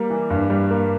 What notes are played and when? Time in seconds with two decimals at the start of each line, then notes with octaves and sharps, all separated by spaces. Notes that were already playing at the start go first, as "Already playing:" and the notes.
Already playing: G3 A#3
0.10 E3
0.30 G2
0.50 G3
0.70 A#3